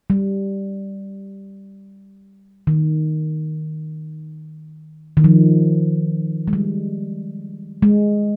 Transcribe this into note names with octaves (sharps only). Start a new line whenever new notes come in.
G3
D#3
D#3
F3
G#3
G3
G#3